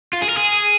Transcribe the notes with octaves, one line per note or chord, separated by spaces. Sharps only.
F4
G#4
A#4
G#4